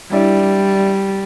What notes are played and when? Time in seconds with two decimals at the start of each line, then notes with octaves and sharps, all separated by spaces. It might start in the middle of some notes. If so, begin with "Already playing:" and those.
0.12 G3 D4 E4 D5